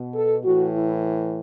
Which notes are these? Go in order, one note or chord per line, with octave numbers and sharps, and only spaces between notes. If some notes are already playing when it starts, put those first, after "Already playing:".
Already playing: B2
A4
A2 E3 F#4
E4